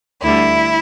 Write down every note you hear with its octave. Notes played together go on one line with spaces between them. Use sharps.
D2 D3 G3 E4